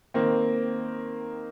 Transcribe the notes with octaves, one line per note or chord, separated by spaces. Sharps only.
D#3 A#3 C4